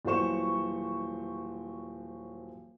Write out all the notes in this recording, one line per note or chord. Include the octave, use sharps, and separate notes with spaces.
D#1 E3 F#3 C5 C#6 E7